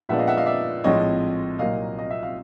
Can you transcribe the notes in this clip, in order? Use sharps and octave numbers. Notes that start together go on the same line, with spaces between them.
A#2 F3 G#3 B3 D4 E5 F#5
D#5 F5
E5 F#5
D#5 F5
D5 E5
A#1 A2 F3 G#3 C4 C#5 D#5
C2 A#2 F#3 A#3 D#5 F5
D#5
E5
F5